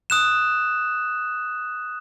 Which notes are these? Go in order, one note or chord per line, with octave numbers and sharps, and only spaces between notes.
D#6 F#6 E7